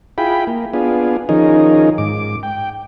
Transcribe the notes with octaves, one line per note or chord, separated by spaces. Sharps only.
E4 F4 G#4 G5 B5
A#3
B3 D4 F4 G#4
D#3 F3 C#4 D#4 G#4 A#4
G#2 D6
G5